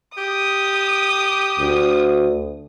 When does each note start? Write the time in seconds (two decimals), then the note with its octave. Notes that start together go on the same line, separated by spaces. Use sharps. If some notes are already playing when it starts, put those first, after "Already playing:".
0.18 G4 D#6
1.60 D2